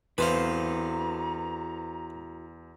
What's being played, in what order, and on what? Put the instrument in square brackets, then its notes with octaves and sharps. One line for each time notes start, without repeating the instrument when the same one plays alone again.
[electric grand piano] E2 [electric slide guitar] E4 F#4 A4 [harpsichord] B4 C5 F5 [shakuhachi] A#5